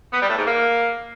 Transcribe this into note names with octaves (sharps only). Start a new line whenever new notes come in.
B3
G3
A2
G#2
A#3